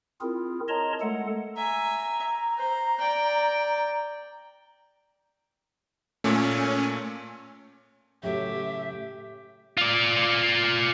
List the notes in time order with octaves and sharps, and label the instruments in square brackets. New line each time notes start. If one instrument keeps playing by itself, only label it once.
[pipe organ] C4 E4 F4 G#4 A#4
A#4 C#5 D#5 A5 A#5 C6
G#3 A3 A4 F#5
[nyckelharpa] E5 G#5 [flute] A#5
[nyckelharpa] C5
D5 G5
[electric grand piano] A#2 A3 [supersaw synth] C#4
[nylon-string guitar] A2 C#3 F#3 [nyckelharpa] G4 [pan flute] E5
[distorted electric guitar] F4 D5